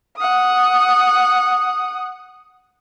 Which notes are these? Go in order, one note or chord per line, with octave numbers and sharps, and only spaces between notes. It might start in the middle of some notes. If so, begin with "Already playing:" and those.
F#5 D#6